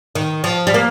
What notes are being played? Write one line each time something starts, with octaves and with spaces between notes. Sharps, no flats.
D#3
F3
G3
A#3